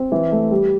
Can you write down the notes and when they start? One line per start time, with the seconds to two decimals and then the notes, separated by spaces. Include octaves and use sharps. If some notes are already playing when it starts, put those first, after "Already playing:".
Already playing: C4
0.12 E3
0.32 A3
0.51 G3